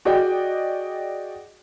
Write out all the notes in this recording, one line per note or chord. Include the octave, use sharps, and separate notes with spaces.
F#4 G#4 D5 D#5 G5